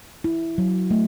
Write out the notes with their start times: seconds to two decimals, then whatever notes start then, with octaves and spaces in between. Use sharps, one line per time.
0.24 E4
0.58 F#3
0.91 A3